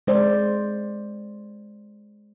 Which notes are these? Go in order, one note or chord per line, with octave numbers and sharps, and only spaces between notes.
G#3 C5 D5